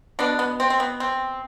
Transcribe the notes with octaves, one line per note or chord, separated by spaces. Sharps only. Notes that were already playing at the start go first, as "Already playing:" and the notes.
B2 B3 D4
B3
C4
C4
B3
C4